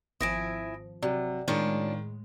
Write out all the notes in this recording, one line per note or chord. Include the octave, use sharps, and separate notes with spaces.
G#1 F3 E4 E5 G#5 D#6 A#6 D7
C3 F#3 D5
A2 D#3 G#3 C#4 D4 F4